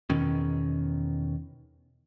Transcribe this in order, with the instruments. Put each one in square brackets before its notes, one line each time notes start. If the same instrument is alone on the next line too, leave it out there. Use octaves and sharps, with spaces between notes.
[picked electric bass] E2 B2 D#3 C#4